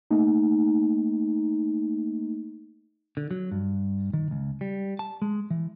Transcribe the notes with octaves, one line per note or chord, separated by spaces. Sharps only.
A3 A#3 D#4
D3
F#3
G2
D#3
C#2
G3
A5
G#3
E3